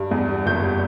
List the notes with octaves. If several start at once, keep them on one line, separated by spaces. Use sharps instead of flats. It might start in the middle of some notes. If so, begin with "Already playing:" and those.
Already playing: G2
E2
G3
F#1 G6
G3